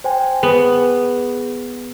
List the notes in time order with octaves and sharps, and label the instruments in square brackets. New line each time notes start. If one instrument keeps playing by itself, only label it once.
[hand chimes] C5 G5 G#5
[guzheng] B3 [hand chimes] G#4